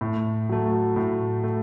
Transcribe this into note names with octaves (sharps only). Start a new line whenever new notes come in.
A2
F#3 A3
A2
A3